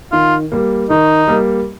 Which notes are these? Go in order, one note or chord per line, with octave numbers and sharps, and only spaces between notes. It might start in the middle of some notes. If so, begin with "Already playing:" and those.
D#3 F4
G3 A#3
D#3 D#4
G3 A#3